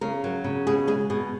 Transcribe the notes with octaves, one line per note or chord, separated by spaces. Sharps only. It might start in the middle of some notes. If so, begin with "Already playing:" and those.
C#3 A#4
F#3
C#3
B2 G#4
G#3 G#4
B2 G#4